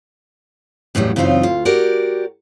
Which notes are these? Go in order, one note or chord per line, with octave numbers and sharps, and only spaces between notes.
E2 A2 C#3 F#3 G3
F#2 C#3 E3 C4 D#4 F4
D2 F4
F#4 G4 A#4 D5